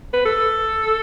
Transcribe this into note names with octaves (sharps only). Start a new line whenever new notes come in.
B4
A4